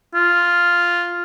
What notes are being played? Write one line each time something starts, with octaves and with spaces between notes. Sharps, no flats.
F4